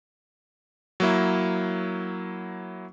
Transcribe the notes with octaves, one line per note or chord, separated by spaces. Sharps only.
F#3 A#3 E4